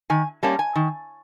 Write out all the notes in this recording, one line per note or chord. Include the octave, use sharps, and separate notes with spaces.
D#3 G#5
G3 A#3 C#4 A5
G#5
D#3